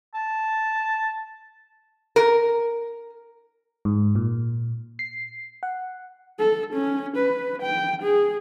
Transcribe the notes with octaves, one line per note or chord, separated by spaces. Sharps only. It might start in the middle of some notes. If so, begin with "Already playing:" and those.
A5
A#4
G#2
A#2
C7
F#5
A4
C#4
B4
G5
G#4